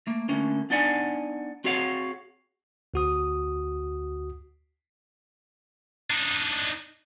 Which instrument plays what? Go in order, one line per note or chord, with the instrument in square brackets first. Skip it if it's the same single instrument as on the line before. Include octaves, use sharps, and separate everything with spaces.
[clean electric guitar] A3 A#3
D3 A3 A#3 C#4
B3 D4 D#4 D5 F#5 G#5
C4 F#4 G#4 C#5 F5 F#5
[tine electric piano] D2 F#4 D#6
[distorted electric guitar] D4 D#4